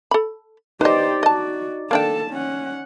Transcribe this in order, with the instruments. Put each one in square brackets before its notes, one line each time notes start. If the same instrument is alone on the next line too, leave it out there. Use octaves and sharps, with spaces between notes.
[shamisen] A4 B5
[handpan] D#4 D5 [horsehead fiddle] G4 C5 [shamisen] B4 D#5
[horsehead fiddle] F#4 [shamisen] D#5 A5
[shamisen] A#3 D4 G5 [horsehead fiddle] A4 A5
[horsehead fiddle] C#4 F#5